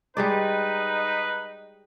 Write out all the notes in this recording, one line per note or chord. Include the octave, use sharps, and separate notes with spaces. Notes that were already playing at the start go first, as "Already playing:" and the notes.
G3 G#3 D#4 B4 D5